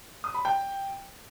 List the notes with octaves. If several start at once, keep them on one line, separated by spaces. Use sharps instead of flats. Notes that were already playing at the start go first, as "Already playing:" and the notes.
D#6
B5
G5